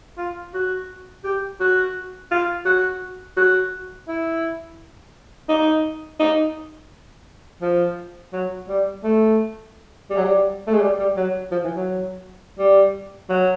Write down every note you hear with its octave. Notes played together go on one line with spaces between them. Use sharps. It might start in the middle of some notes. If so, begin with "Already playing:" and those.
F4
F#4
G4
F#4
F4
F#4
F#4
E4
D#4
D#4
F3
F#3
G3
A3
G3
F#3
G3
A3
G#3
G3
G3
F#3
F3
E3
F#3
G3
F#3